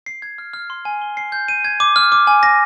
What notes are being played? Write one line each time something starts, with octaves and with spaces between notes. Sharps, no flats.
C7
G#6
F6
F6
C6
G#5
G7
C7
G6
D#7
G#6
D6
F6
D6
G#5
A#6